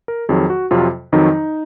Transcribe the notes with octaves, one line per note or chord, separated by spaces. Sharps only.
A#4
F2 D#3 F#3 G#4
F#4
F2 C3 F#3 F4
F2 D#3 F#3 D#4